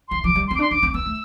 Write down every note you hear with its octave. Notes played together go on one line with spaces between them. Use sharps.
E3 C6
F3 D6
G3
C6
C4
D6
D4
C6
D4 D6
C4
D6
B3 E6
A3